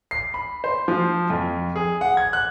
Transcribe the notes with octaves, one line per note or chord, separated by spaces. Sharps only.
C7
B5
C5
F3
F2
G#4
F#5
G#6
F#6